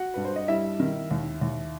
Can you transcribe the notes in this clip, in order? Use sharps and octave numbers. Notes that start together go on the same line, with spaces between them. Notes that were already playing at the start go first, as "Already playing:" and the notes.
Already playing: F#4 F#5
G2 B4
C5
D#5
G3 E4 E5
D#3
D#2
D#2